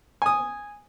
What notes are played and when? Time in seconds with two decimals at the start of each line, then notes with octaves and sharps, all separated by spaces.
0.22 G#5 D#6